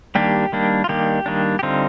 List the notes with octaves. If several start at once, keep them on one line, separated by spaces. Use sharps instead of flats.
D#3 G3 A#3 D4 G4
D#3 G3 A#3 D4
F4
D#3 G3 A#3 D4 G4
D#3 G3 A#3 D4
G4
D3 G3 C4 D#4 F4